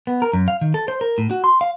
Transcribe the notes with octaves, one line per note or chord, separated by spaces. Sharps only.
B3
A#4
F#2
F5
D#3
A4
C5
A#4
A2
F#4
C6
F5